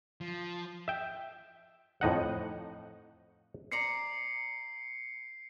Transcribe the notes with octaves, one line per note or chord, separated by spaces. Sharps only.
F3
E5 G5
F2 A2 D#4 F#5
C5 D5 A#5 C7 C#7